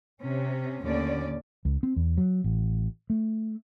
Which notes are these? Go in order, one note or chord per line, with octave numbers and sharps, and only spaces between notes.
C3 C#4
D#2 A2 D3 C#4 D5
C#2
C4
E2
F#3
A1
A3